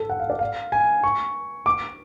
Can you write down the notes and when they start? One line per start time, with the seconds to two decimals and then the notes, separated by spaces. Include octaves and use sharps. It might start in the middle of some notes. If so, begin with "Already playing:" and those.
Already playing: A4
0.10 F#5
0.20 F5
0.30 D5
0.39 F5
0.72 G#5
1.03 C#6
1.66 D6